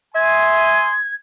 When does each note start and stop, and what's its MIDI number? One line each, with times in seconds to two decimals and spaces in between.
0.15 0.86 76
0.15 0.93 80
0.15 0.93 84
0.15 0.93 87
0.15 1.14 92